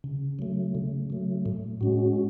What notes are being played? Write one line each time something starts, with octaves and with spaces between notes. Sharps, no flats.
C#3
F#3 A3
C#3
F#3 A3
A2
G#3 C#4 F#4